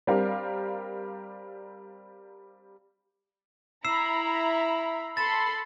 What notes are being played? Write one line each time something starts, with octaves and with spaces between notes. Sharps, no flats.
G3 C4 D4 G4 A#4 F5
E4 A#5 B5 E6 C7 E7
A4 B5 C6 A6 E7